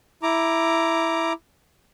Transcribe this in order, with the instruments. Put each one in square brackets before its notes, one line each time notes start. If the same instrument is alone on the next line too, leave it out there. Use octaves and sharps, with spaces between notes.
[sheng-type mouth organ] E4 A#5 D6